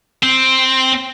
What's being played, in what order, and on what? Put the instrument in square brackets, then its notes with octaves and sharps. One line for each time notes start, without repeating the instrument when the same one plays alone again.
[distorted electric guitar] C4